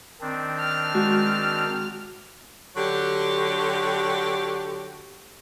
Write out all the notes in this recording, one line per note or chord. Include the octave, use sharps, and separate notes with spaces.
D#3 C4 D4
A5 F6
G#3 F#4
D3 F#3 F#4 G4